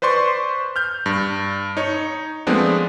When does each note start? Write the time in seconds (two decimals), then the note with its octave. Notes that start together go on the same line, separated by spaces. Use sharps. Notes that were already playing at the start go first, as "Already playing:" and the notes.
0.02 B4 C5 D5 C6 C#6
0.76 F6 G6
1.06 G2
1.77 D#4 C#5
2.47 F3 G#3 A3 B3 C4 D4